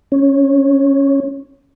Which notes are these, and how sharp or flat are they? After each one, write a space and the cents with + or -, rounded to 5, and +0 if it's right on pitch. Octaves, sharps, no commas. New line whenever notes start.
C#4 -5